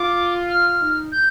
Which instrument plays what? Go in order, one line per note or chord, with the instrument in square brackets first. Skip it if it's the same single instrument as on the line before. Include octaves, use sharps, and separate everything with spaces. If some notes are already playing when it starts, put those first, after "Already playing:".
Already playing: [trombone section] F4 [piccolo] D6
[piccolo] F6
[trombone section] D#4
[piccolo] G6